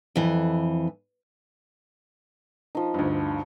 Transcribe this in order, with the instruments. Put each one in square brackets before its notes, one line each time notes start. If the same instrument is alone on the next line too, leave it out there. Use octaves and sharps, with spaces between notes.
[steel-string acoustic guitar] F2 E3
[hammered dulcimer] F3 D#4
[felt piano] D2 G2